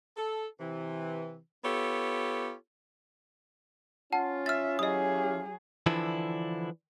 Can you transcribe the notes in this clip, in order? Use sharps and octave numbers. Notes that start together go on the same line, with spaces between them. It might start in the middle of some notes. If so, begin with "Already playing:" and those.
A4
C3 E3
B3 F4 G4 A4 C#5
C#4 F4 F#5 A5
E5 F6 A6
F#3 E4 G4 G#4 D#5 F5 D#6
D3 E3 F3 D4 E4